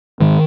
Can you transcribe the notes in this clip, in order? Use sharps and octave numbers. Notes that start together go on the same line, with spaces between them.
G#2 D#3